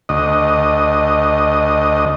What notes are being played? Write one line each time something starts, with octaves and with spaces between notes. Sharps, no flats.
D2 D#5